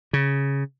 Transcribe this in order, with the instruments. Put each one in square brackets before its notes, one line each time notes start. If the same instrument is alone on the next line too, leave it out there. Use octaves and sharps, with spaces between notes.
[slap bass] C#3